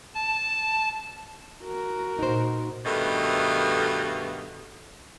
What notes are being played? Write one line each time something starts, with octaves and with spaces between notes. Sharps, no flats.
A5
F#4 A#4
A#2 D#4 C5
G2 B2 D#3 A3